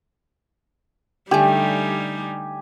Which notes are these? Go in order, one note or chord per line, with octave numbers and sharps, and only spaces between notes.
D3 G3 A3 D#4 G4 G#5